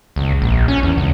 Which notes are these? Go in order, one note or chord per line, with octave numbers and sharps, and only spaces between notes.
C#2
A#1
C#4
E2
C#2